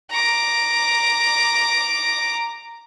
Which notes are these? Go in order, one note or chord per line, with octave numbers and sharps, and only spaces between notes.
A#5 D6